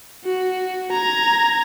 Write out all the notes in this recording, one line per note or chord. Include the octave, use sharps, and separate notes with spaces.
F#4
A#5 G#6